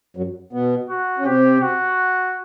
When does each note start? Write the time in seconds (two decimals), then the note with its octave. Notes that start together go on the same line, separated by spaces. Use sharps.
0.17 F#2 F#3
0.53 B2 B3
0.89 F#4
1.19 C#4
1.25 C3 C4 G4
1.62 F#4